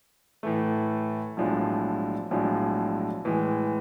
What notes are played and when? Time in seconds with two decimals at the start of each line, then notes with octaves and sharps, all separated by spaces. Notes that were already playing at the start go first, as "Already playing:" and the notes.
0.43 A2 E3 A3
1.37 B1 A2 F3 G#3 D4
2.31 B1 A2 F3 G#3 D4
3.25 A2 E3 G#3